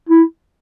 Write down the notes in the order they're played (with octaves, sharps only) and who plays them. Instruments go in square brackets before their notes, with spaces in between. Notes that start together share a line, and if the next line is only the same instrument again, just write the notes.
[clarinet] E4